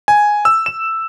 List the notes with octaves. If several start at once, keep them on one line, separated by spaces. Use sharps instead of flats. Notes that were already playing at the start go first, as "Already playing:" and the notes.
G#5
E6
E7